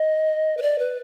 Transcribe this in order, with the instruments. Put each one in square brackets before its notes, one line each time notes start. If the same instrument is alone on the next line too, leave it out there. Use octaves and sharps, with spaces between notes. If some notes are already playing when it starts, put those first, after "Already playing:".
Already playing: [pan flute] D#5
B4
D5
B4